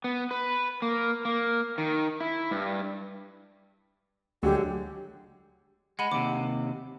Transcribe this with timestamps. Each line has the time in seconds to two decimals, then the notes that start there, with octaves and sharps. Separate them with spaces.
0.04 B3
0.31 B4
0.82 A#3
1.25 A#3
1.78 D#3
2.20 E4
2.51 G2
4.43 D2 D3 F#3 G#3 G4
5.99 G#3 F#5 B5 D#7
6.12 D#2 C3 D6